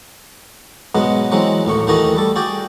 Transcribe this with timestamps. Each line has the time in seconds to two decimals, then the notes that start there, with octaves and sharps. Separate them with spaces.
0.95 G#2 B2 F#3 G#3 B3
1.32 E3 F#3 G#3 C4
1.65 A1 D#2 A2 C#6
1.87 D#2 D#3 E3 A3 F#4 D#5
2.16 G3 A4
2.36 F#4 G#4 D5 G5